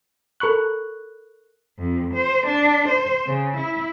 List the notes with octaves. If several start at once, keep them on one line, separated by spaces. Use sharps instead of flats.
A4 A#4 B5 C#6 F#6
F2
C5
D4
C5
C#3
E4